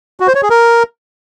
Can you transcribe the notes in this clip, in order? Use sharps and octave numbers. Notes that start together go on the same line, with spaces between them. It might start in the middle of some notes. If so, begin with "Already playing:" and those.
F#4
C5
C#5
G#4
A#4